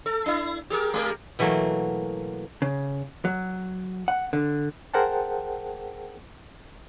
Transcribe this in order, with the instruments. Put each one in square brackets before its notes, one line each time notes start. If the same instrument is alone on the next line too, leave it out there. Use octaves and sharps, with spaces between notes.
[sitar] A4
D4 E4
G4 G#4 A#4
G#3 G4 A#4
[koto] B2 E3 F#3 A3 A#3
[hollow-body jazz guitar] C#3
F#3
F#5
D3
[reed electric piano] G#4 A#4 C5 F#5 G5 A5